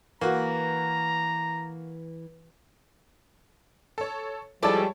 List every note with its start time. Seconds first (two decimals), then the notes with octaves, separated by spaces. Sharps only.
0.21 E3 A#3 F#4 A#5
3.98 A4 C#5
4.63 F3 G3 G#3 E4 A4 C#5 D5 A5